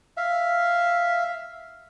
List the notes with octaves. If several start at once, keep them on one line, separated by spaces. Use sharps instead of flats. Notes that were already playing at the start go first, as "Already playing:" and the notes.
E5 F5